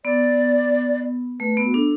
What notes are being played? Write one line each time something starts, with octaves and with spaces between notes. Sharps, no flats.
B3 D5
A3 B4
B3
F#4
D4 A4